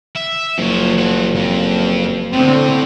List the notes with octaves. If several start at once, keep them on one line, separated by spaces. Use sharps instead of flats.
E5
F#1 F3 C#5
F3 F#5
F2
A2 D3 C4